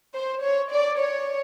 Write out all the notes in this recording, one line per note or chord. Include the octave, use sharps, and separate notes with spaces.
C5
C#5
D5
C#5